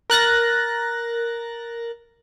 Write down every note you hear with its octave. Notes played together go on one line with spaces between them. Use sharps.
A#4 F#6 A6 A#6